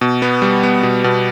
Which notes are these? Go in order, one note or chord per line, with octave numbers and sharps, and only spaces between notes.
B2
B3
G3
B3
B2
B2